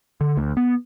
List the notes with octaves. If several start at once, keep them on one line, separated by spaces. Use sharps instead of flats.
D3
D2
B3